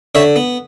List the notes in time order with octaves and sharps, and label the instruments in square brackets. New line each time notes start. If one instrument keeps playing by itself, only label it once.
[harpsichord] D3 C#5 E5
B3